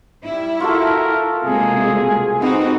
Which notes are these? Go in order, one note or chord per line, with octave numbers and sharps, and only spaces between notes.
G3 E4
F4 F#4 A4 A#4
C3 G#3 A#3 G#4
B3 C4 D#4 F#4